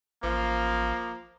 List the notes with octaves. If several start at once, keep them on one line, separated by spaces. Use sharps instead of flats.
A1 F3 A#3